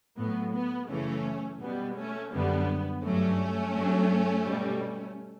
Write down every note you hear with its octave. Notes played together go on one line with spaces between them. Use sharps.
A2 F#3 B3
B3
F#2 C#3 E3 A3 C#4
B2 G3 B3
A3 C#4
F#2 D3 G3 B3
G2 F#3 A3 C#4
G2 F#3
B2 G3